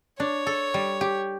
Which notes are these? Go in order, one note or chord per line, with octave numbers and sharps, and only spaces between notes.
D4 C#5
A4
G3
G4